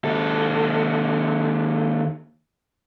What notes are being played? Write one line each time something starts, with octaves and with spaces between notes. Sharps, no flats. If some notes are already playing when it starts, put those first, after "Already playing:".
D#2 A4